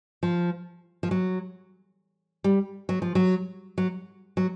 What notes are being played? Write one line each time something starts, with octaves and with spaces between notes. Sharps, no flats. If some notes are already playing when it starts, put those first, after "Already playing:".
F3
F3
F#3
G3
F#3
F3
F#3
F#3
F#3